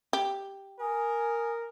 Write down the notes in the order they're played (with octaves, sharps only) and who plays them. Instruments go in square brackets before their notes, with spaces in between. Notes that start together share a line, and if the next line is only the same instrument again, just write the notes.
[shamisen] G4
[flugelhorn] A#4 [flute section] G#5 D#6